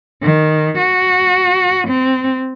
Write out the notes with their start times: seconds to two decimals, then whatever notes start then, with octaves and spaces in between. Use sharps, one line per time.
0.23 D#3
0.78 F#4
1.88 C4